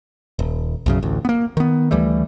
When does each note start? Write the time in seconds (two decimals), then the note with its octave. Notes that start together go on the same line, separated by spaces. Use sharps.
0.39 D#1
0.86 B1 F#2 C#3
1.03 A1 D2
1.25 A#3 B3
1.57 D#3 B3
1.91 D2 E3 G3 A3